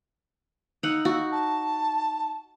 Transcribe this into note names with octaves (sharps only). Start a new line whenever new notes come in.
D#4 F#5 E6
F#4
A5